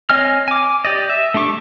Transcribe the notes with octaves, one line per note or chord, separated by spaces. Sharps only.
C4 C#5 D#5 G#5 F6
G#5 D6
G4 D5 D#5
E5
A3 D4 G4 C#6 D6